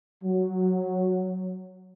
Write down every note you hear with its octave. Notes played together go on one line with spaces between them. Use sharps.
F#3